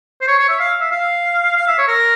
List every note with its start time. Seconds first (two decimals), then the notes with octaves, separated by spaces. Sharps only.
0.21 C5
0.28 C#5
0.39 C#5
0.49 E5
0.60 F5
0.81 E5
0.91 F5
1.57 F5
1.68 E5
1.79 C#5
1.88 A#4